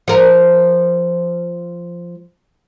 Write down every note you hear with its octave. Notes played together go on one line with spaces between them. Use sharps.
F3 A#4